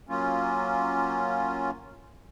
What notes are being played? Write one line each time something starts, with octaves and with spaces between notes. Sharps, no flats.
F#3 A#3 C#4 F4